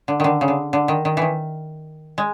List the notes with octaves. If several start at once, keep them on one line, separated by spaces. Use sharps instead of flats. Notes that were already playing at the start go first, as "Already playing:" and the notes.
D3
D3 D#3
C#3
D3
D3
D#3
D#3
D#3 E3
G#3